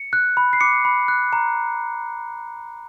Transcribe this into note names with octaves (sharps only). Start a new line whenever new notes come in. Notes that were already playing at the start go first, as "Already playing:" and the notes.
Already playing: C#7
F#6
B5
C7
D6 C#7
B5
F#6
A#5